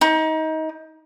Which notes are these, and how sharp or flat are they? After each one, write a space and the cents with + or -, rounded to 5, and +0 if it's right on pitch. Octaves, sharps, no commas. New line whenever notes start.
D#4 +25